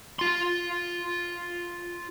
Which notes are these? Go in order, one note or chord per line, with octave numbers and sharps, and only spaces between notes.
F4 C6